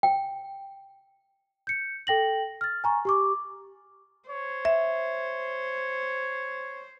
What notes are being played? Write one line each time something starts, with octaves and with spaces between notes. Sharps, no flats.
G5
G6 C#7
A4 G5 A#6 F#7
F6 A6
G#5 A#5 C#6
G4 C#6 D6
C5 C#5
E5